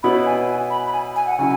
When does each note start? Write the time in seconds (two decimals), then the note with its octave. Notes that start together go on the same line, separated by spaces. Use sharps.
0.03 B2 B3 E4 C#5 B5
0.26 G#5
0.49 G#5
0.70 B5
0.86 B5
0.93 G#5
1.16 G#5
1.27 F#5
1.39 C#3 F#3 E4 G#5